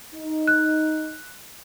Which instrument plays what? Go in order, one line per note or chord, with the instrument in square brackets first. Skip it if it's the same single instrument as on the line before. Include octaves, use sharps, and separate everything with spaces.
[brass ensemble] D#4
[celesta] F#6